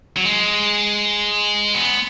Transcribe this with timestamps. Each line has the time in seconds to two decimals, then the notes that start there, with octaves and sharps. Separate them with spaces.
0.17 F#3
0.25 G#3
1.75 B3